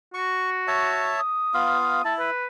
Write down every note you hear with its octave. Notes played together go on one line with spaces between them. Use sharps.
F#4 C#6
C#5 E5 A5
D#6
B3 F4 F5
E4 A5
B4